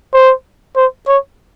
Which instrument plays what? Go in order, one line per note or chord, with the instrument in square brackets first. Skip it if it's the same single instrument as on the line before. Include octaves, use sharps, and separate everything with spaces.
[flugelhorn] C5
C5
C#5